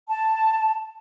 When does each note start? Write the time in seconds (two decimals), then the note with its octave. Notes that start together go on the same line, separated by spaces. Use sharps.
0.09 A5